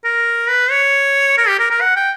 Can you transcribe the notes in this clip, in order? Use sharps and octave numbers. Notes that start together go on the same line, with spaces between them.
A#4
B4
C#5
A#4
G4
A#4
A#4
F#5
G5